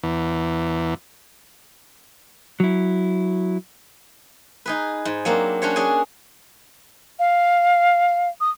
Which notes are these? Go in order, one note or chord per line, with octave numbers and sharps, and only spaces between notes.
E2
F#3 E4
D#4 G#4 B4
G#2
F#3 A#3 C4 D4
C#4 D4 F#4 C5 C#5
C#4 D4 G#4 D5 G#5
F5
D#6